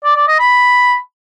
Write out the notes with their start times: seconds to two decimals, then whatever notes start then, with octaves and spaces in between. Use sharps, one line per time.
0.04 D5
0.16 D5
0.28 D#5
0.39 B5